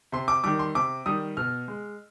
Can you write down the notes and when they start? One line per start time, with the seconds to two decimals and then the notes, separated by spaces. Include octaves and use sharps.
0.12 C3 C6
0.28 D6
0.44 D#3 G3 D6
0.59 C6
0.75 C3 D6
1.06 D#3 G3 D#6
1.37 B2 F6
1.68 G#3